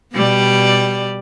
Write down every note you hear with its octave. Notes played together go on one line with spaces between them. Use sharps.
B2 G3 D5